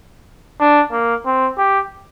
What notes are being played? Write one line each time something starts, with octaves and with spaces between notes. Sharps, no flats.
D4
A#3
C4
G4